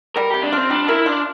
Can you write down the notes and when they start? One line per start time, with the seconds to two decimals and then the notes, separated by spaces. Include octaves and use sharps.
0.16 G3 A#4
0.30 C3 G4
0.43 D4
0.53 C4 F4
0.70 G3 D4
0.88 E4 A#4
1.06 D4 F4